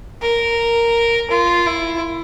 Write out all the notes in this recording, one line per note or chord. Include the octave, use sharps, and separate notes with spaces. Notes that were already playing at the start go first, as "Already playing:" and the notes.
A#4
F4
E4